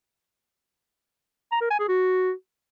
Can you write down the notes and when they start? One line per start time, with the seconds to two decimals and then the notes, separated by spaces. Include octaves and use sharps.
1.52 A#5
1.61 A#4
1.70 G#5
1.79 G#4
1.88 F#4